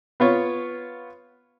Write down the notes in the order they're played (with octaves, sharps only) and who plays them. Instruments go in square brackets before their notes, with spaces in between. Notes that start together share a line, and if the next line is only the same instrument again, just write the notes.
[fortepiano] B3 F4 C#5